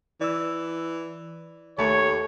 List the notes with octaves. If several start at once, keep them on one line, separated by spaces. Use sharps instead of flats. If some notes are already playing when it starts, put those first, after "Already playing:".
E3 D5 E6
D#2 A3 C#5